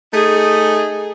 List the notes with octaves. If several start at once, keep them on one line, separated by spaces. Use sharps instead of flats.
A3 D#4 G#4